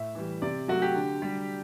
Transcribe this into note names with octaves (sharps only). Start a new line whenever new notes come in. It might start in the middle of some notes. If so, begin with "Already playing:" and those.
Already playing: A2 E5
E3 G3
C3 D5
F#3 A3 F#4
G4
D3
G3